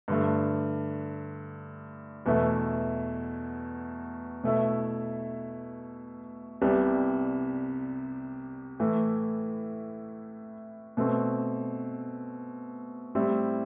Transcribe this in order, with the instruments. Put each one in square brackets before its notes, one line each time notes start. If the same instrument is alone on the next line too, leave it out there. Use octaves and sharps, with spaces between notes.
[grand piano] G2 D3 A3
E2 B2 A3 E4
B2 A3 E4
C2 C3 G3 B3 E4
A2 E3 A3 E4
B2 A3 C4
A2 G3 C4 E4